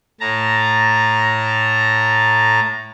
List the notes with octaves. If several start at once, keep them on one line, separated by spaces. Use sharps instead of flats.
A2 A5 A#5